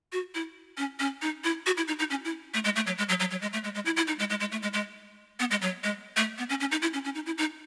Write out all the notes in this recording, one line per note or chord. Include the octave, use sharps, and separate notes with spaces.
F#4
E4
C#4
C#4
D#4
E4
F#4
E4
D#4
D#4
C#4
E4
A3
G#3
A3
F#3
G#3
F#3
F#3
F#3
G#3
A3
G#3
G#3
E4
E4
D#4
G#3
G#3
G#3
A3
G#3
G#3
B3
G#3
F#3
G#3
A3
B3
C#4
C#4
D#4
E4
C#4
C#4
D#4
E4
D#4